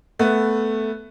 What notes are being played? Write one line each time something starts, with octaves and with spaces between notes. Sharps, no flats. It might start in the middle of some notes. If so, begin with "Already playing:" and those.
A3 B3